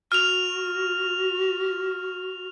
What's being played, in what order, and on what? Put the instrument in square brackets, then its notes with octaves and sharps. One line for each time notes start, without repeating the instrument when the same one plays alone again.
[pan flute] F#4 [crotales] F6 F7